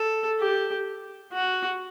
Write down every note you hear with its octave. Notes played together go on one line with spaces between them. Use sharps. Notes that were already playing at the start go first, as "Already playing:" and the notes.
Already playing: A4
G4
F#4